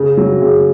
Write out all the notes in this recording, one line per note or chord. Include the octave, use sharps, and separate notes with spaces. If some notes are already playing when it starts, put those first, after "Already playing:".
Already playing: C#3
F#3
C#3